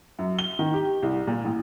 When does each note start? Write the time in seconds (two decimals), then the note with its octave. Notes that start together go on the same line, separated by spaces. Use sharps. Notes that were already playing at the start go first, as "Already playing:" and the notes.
0.19 F#2
0.39 G7
0.59 D#3
0.74 G4
1.02 C2
1.27 A#2
1.44 A1